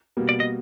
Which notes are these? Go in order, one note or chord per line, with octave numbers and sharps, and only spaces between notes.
B2 G3 A#3
D5
D#5